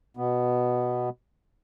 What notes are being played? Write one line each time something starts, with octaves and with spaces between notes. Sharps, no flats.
B2 B3